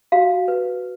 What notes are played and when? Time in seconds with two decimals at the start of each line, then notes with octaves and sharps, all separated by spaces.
0.12 F#4 F5
0.48 B4